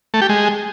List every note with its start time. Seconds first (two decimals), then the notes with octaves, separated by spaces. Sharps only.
0.14 A3
0.21 G4
0.29 G#3